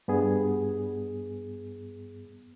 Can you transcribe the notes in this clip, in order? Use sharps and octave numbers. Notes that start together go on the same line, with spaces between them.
G2 B3 G#4